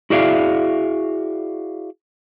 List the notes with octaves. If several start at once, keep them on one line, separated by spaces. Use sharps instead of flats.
E4 F#4 G#4 D5 E5 F5